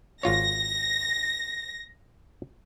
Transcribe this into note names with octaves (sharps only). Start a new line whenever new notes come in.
G#1 F4 C#5 A#6